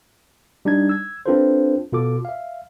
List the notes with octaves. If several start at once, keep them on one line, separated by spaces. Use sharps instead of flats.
G3 D4 D#4 G#6
E6 G#6
C4 D4 F4 A4 B4 C5
B2 F4 A4 D6
E5 F5